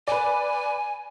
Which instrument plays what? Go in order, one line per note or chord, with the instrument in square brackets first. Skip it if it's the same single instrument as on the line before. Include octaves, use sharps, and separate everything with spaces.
[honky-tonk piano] B4 D5 [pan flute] G#5